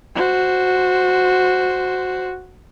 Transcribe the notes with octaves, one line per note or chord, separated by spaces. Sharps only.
F#4 C5